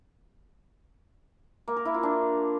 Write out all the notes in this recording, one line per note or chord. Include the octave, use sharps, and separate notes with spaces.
A#3
A#4
E4
F4
D4